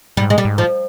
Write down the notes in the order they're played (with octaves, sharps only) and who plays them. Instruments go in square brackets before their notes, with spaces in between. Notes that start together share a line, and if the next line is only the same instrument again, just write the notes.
[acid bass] G#2 [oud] G3
[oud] G#3
G3
[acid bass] G#2
[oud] F3